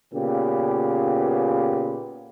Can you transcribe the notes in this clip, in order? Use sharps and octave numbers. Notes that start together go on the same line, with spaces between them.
A#2 C#3 B3 G4